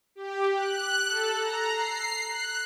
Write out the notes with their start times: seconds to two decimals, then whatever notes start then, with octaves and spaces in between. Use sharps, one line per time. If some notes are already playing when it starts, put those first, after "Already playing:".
0.15 G4
0.56 F#6
1.06 A4
1.40 A#5
1.73 C7
2.29 F#6